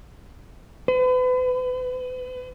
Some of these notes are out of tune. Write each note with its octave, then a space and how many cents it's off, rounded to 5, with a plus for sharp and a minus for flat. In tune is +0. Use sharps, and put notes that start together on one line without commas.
B4 +40